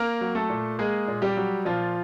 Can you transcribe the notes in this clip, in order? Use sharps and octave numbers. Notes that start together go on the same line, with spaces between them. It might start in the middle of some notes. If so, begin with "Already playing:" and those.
Already playing: A#3 A#4
F#3
A3 A4
A#2
G#3 A#3 G#4
A#2
G3 G4
F#3
A#2 F3 F4